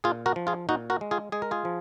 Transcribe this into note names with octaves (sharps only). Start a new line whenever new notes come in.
A#2 F4 G#4
F#4 A#4
F3
F4 G#4
A#2 D#4 F#4
F#4 A#4
G#3
F4 G#4
G#3 G#4
A#4
F4 G#4
F3